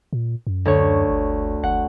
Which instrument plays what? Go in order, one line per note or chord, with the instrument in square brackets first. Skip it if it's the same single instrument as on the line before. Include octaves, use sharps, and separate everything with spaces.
[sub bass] A#2
F#2
[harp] D2 C#5
[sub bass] G1
[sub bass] F#1 [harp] F#5